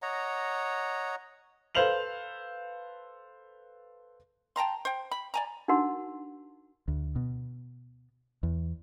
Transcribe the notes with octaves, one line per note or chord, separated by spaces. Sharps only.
C#5 D#5 F#5 A#5
A4 B4 C5 F5 F7 F#7
G5 A5 A#5 C6
C5 G5
B5
D5 G#5 A#5
D4 D#4 F#4 A#4 F#5 C6
D2
B2
E2